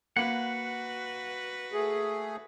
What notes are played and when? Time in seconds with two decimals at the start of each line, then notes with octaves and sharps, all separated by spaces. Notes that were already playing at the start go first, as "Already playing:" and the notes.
0.17 A#3 F#4 B4 F#5 B5
1.73 A3 G#4